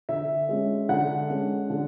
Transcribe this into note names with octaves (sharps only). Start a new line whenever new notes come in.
D3 E5
G#3 C#4
D3 F#5
G#3 C#4
D3